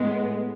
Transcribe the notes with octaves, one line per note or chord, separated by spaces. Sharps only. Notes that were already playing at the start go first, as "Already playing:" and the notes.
Already playing: A2 G#3 B3